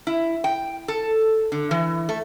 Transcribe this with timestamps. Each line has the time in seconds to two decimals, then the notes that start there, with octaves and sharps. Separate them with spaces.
0.07 E4
0.44 G5
0.88 A4
1.52 D3
1.71 E3
2.09 A3